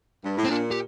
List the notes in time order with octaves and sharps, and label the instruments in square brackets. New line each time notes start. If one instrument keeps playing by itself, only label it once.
[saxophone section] G2
A2
[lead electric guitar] C4
[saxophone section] A#2 [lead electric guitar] D4
[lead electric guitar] G4